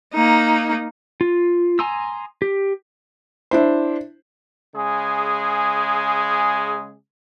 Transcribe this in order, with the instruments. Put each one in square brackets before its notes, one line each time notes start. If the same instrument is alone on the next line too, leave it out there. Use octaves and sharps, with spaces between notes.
[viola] A#3 D#4
[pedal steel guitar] F4
G#5 A#5 C6 D#6 E6
G4
[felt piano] D4 E4 C5
[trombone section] C#3 G#3 G#4